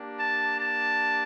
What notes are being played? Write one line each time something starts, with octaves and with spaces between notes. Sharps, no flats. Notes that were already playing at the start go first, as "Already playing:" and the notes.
Already playing: A#3 D4 G4
A5
A5